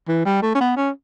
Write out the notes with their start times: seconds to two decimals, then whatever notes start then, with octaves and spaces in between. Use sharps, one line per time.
0.08 E3
0.26 G3
0.42 A3
0.55 C#4
0.60 B3
0.77 C#4